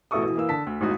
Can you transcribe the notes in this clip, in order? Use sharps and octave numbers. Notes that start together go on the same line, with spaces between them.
A1 B2 E4 A4 C#6 D#6
B2 E3
E3 A#3 E6
D3 A5 B6
D2
D#1 G#1 A2 D#4 F#4 D#6